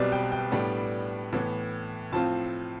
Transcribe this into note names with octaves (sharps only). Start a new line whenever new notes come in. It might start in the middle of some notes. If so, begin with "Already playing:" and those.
Already playing: B1 B2 G3 C4 B4 D5
G5
G5
A2 G3 B3 D4
A2 E3 B3
A2 F3 C4 F4 A5